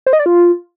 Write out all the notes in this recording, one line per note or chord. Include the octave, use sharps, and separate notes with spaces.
C5
D#5
D5
F4